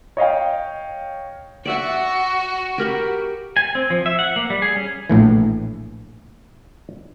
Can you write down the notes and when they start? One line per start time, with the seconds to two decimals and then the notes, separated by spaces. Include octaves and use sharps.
0.17 C#5 D#5 F5 G5
1.65 F#4 D5 E5 F#5
2.78 G4 A#4 B5
3.57 G#5
3.75 C4
3.90 F3
4.06 E5
4.19 F#5
4.36 A#3
4.50 G3
4.62 G#4
4.76 C#4
5.10 A#1 A2 E3